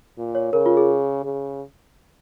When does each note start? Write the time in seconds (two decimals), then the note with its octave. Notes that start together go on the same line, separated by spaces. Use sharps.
0.18 A#2
0.35 C#5
0.53 C#3 A#4
0.66 F4
0.77 G#4
1.24 C#3